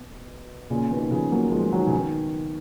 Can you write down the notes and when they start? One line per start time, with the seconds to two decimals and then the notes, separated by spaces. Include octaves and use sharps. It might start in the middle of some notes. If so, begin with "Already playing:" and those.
Already playing: B2
0.70 A#2 C#3
0.90 B2 D#3
1.11 C#3 F3
1.32 F#3 A#3
1.52 F3 G#3
1.72 D#3 F#3
1.87 C#3
1.92 B2 D#3